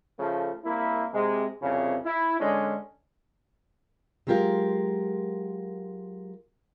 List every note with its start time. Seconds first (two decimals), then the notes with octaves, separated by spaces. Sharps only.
0.19 C#3 F3 A3
0.65 C2 A#3 E4
1.13 C3 G#3
1.62 C2 F2 C#3
2.05 E4
2.40 D3 G#3 C#4 D4
4.27 F#3 G#3 F4 G4 A#4 F5